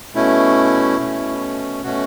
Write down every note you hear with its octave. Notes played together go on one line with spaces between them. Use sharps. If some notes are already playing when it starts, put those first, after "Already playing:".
B2 A3 C#4 E4
B2 A3 C#4
B2 A3 C#4 F#4